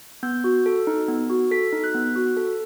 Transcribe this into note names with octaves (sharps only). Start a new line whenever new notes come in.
B3 G6
F#4
A4
D#4
B3
F#4
A4 B6
D#4
F#6
B3
F#4
A4